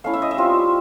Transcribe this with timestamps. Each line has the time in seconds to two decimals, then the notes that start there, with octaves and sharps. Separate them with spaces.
0.04 A3 C#4 E4 F5
0.14 E5
0.22 D#5
0.31 E5
0.37 G3 C4 F4